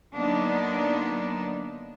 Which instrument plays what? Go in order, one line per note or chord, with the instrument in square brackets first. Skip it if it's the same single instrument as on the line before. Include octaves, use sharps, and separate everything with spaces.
[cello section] D3 F#3 A#3 B3 D4 D#4